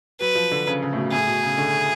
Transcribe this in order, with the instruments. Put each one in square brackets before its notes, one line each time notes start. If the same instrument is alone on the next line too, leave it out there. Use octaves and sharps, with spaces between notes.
[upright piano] F#3 [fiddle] B4
[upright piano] F3
D3
C#3
C#3
A2
B2
[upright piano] A2 [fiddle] G#4
[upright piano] B2
C#3
D3